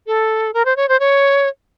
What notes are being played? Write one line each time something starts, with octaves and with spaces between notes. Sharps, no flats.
A4
A#4
C5
C#5
C5
C#5